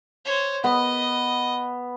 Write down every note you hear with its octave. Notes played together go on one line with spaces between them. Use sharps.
C5 C#5
B3 D#5